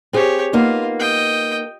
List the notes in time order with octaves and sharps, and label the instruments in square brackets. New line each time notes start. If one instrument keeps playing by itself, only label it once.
[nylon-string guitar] C4 G#4 [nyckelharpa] G4 C#5
[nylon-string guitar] A#3 B3 D#4 [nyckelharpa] F4
[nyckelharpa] D#5 G5